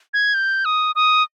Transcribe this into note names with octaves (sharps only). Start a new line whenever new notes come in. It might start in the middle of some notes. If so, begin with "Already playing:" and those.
G#6
G6
D#6
D#6